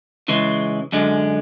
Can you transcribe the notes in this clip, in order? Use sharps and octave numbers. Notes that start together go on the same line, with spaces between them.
C#3 E3 G#3
F#2 D3 G#3